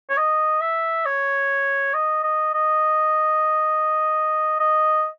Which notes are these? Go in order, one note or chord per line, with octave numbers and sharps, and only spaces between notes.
C#5
D#5
E5
C#5
D#5
D#5
D#5
D#5